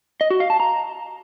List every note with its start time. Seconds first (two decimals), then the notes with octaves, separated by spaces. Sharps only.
0.21 D#5
0.30 F#4
0.40 F5
0.50 A5
0.60 A#5